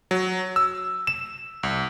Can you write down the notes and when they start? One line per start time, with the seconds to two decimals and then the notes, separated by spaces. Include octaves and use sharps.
0.11 F#3
0.56 E6
1.07 E7
1.63 C2